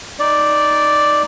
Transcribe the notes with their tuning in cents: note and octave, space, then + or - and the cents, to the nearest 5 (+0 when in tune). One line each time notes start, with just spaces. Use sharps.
D#4 +0 D5 +0